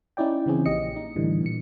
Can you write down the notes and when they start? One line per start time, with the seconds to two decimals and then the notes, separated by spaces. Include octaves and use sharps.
0.17 C#4 D#4 E4 D5 G5
0.46 C#3 E3 C4 C#4 G#4
0.66 A#1 A#2 G4 D#5 C#7
0.96 D#4
1.16 A2 D3 E3 G3
1.43 A#2 C#7